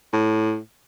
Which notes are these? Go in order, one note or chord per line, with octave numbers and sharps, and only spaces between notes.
A2